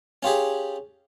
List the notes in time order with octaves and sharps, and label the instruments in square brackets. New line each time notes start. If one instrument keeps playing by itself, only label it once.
[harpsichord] C#4 F4 G4 G#4